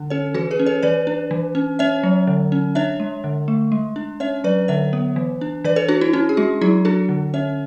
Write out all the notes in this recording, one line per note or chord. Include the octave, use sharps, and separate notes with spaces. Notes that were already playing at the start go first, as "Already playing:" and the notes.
Already playing: D3 D4
C#4 A4 C#5
E3 F#4 A4
G#4 B4
C#4
A4 C#5
E3 B4 D5
D4
E3
C#4
C#4 C#5 E5
F#3
D3
C#4
D4 C#5 E5
G#3
D3
A3
G#3
D4
C#4 C#5 E5
F#3 B4 D5
D3 C#5 E5
B3
E3
D4
E3 B4 D5
A4 C#5
D4 F#4
E4
C#4 E4
G#4
G#3 F#4
F#3 E4 G#4
D4 F#4 A4
D3
C#4 C#5 E5